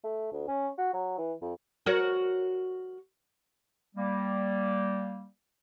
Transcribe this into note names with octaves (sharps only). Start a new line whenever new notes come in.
A3
D2
C#4
F#4
F#3
E3
F2
F#4 A#4 C#5
G3 A#3